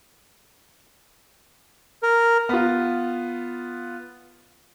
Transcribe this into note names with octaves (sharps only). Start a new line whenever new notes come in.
A#4
B3 F4